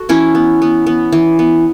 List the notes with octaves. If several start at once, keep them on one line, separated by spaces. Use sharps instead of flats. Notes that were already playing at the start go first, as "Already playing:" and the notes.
Already playing: F#4 A4
E3 C#4 E4
B3
B3
B3
E3
B3